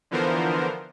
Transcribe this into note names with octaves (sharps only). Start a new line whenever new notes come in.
D3 E3 F3 B3 A#4 C5